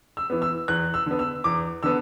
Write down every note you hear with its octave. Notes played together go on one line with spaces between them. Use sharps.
E6
E3 B3
E6
E2 F#6
E6
D3 B3
E6
E2 D6
D3 B3 E6